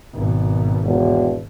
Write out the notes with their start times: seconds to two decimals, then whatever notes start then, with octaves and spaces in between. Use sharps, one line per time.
0.14 G#1 B2
0.83 E1